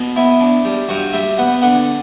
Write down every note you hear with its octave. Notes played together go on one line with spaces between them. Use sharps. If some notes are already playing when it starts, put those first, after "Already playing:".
Already playing: B2
B3 E4
D4
G3
G2 F#4
G3 E5
B3 F#5
D3 F#5